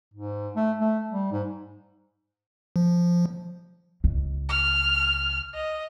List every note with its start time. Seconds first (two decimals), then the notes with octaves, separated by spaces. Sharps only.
0.14 G#2
0.56 A3
0.81 A3
1.11 G3
1.32 G#2
2.76 F3
4.04 C#2
4.49 F6
5.54 D#5